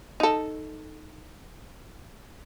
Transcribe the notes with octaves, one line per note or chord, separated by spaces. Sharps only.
D#4 A4